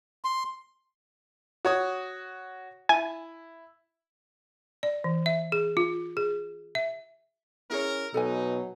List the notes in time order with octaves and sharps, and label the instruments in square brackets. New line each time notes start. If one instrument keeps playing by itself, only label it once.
[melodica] C6
[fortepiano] F#4 C#5 D#6
[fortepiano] E4 [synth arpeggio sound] G#5
[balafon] D5
E3
E5
G#4
F4
G#4
E5
[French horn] C#4 [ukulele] E4 G#4 C#5 [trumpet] A#4
[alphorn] B2 [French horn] F#3 [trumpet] D#4 [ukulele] A4 B4 G#5